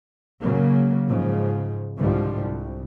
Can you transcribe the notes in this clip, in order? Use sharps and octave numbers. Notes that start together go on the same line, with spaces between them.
C#3 F#3 A#3
G#2 C#3 F3
C2 G#2 D3 F3 G3
C2